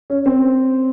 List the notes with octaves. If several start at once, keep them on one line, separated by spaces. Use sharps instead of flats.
C#4
C4